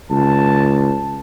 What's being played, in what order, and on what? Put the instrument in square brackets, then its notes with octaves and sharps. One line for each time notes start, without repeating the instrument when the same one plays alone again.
[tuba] C#2 [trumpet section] A5